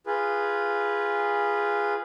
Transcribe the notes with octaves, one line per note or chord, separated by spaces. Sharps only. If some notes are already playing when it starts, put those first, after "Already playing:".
F4 G#4 B4